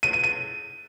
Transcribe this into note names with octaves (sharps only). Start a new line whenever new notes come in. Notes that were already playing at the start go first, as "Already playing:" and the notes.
D#7
D#7
D#7